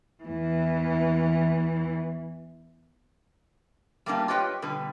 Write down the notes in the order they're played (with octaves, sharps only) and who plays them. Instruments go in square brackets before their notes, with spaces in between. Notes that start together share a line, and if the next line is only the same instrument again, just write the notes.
[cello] E2 E3
[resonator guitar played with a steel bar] G3 A3 A#3 D4 D#4 F4
F4 G4 B4 C#5 D#5 G5
B2 D3 G3 B4